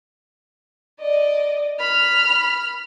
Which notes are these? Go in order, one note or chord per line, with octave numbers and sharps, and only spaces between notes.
D5 D#5
B5 F6